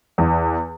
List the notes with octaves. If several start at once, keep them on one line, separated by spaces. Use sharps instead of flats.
E2